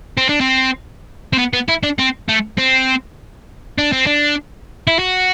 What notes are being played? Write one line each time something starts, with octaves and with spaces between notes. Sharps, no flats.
C4
D4
C4
C4
B3
B3
E4
D4
C4
A3
C4
D4
C4
D4
E4
F#4